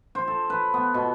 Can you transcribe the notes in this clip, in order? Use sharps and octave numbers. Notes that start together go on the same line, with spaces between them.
C5
A4
B4
B3
B2